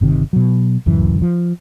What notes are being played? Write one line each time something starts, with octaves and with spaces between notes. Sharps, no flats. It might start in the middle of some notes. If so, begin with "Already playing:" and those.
G1 C3 D#3
B2 F#3
D1 C#2 F#2 E3
F3